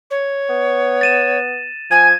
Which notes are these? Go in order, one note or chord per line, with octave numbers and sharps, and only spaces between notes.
C#5
B3
A6 D#7 E7
F3 G#5 G#6 D#7